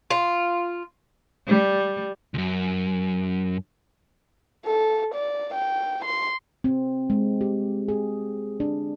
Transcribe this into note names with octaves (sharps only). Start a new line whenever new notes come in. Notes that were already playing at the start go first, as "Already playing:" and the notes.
F4
G3
C#2 F#2
A4
D5
G5
C6
C4
G#3
G4
G#4
D4